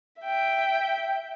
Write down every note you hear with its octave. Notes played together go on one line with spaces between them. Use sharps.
E5 G5